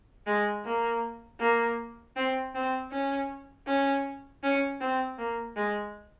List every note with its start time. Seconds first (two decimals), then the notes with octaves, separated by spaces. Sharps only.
0.27 G#3
0.65 A#3
1.40 A#3
2.16 C4
2.55 C4
2.91 C#4
3.67 C#4
4.43 C#4
4.81 C4
5.18 A#3
5.56 G#3